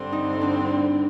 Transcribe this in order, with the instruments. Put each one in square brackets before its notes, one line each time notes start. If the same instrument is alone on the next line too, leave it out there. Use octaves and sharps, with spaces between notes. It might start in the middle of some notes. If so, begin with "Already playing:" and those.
Already playing: [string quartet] G2 D3 G3 C4
[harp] D#4
D4